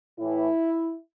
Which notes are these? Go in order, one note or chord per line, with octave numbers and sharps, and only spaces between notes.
A2 E3 E4